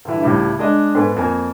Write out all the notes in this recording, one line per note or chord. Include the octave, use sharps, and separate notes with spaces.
G2 D3 E3
C#2 A2 G3 E4
G#3 D4 D#5
G#2 B3 A4 G#5
F2 A#3 G#5